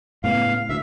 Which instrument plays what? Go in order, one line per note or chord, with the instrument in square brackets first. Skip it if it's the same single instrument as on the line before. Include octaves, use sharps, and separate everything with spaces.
[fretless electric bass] A2 C#3 B3 [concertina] F5
[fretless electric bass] D2 [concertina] E5